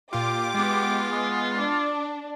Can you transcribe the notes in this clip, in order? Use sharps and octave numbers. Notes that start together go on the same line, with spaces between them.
A#2 F4 G4 D6
G#3 B3 F4
G#4
D4 D5